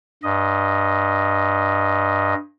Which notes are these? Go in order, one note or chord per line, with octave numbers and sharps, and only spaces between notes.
G2 D#5